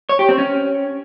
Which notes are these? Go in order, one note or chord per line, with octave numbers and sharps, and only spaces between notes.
C#5
G4
C4
C#4